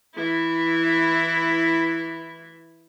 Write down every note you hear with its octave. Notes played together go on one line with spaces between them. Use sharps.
E3 E4